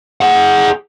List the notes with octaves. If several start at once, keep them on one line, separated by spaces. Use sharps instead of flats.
G#4 F#5